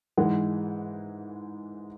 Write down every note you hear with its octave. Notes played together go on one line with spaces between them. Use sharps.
G#2 E3 G#3 F#5